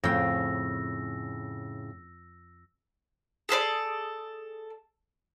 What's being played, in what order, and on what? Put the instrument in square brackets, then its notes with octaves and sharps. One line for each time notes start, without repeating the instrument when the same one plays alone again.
[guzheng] F2 G5 [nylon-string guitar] A2 C#3 [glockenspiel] E6 A#6
[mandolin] G#4 A4 B4 D5